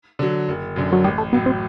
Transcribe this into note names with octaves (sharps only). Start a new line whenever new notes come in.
D3 F#3
F#1
F#2 D3
F#3
A1 G3
A3
A2 F#3 B3
C4